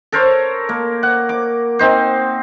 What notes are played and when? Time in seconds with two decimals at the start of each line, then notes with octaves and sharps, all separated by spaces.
0.12 A4 A#4 C5 C#5
0.69 A#3
1.03 F#5
1.29 D6
1.79 C4 D#4 C5